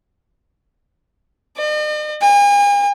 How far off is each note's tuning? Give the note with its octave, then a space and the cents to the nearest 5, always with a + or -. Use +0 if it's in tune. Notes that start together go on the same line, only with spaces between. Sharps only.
D#5 -45
G#5 -40